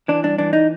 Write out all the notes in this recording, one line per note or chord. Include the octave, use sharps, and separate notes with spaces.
E3 D4
G2 D4
E3 D4
D#4